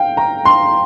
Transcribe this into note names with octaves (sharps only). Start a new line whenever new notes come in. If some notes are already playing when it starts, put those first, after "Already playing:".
Already playing: F5 G5
A#5
C6